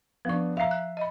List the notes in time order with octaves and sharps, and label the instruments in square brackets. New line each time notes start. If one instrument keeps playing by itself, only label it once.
[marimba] F3 C#6 [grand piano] B3 D4
[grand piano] E5 C7 [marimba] F5 A#5
[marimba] F#6
D#5 B5